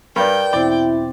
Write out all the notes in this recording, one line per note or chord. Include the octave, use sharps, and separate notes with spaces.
G2 A#4 B4 D5 G5
E2 B2 C4 E4 D5